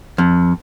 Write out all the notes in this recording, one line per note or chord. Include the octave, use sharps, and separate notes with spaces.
F2